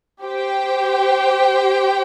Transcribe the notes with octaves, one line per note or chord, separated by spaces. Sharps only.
G4 C5 G5